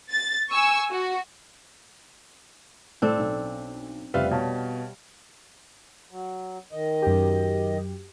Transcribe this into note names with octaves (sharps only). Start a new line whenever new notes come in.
A6
G#5 C#6 E6
F#4
A2 C4 D4 A4
B1
F1 C#3 G3 C4 F4 B4 E5 F5
B2 C#5 F5 A5
F#3
D#3 D#5
F#2 G4